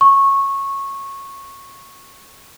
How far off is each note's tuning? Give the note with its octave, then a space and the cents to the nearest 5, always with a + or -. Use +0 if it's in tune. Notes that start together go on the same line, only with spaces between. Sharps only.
C#6 -15